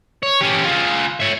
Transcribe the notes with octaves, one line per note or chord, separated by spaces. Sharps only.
C#5
C#4 G4
F4 G#4
C#5 E5